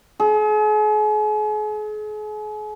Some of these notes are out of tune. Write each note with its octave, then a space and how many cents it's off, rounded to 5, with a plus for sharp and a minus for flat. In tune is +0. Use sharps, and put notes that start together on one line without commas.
G#4 +40